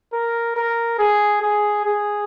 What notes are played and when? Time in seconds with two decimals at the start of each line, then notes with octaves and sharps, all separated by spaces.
0.13 A#4
0.56 A#4
0.99 G#4
1.42 G#4
1.86 G#4